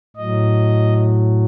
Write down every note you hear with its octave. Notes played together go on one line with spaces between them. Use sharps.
A2 F#3 D#5